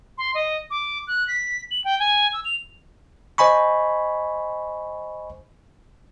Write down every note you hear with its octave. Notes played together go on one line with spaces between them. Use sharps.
C6
D#5
D6
F#6
B6
F#7
G5
G#5
E6
F7
C5 D#5 G#5 B5 C#6